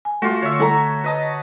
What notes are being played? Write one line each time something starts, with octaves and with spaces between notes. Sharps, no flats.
G#5
A3 F4 F#4
D3 C#5 E5
A4 A#5
B4 D#5 A5